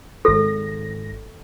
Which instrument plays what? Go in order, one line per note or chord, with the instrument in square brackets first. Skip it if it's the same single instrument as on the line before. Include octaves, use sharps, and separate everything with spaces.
[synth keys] G#1 A#6 [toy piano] A4